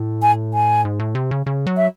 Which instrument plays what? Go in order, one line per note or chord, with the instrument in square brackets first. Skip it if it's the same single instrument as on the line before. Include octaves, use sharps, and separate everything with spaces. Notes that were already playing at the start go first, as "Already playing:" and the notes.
Already playing: [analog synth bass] A2
[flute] G#5
G#5
[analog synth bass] G#2
A2
C3
C#3
C#3
F#3
[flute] E5